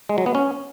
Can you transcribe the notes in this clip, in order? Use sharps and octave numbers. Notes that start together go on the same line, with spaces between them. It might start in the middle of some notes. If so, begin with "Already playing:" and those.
G#3
F#3
B3
C#4